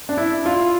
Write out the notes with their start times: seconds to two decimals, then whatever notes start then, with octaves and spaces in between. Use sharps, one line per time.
0.09 D4
0.18 E4
0.46 F4